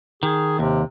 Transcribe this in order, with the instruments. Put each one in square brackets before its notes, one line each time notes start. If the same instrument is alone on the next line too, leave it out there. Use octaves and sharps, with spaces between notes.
[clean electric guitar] D#3 [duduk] G#4
[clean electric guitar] D#2 [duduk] C3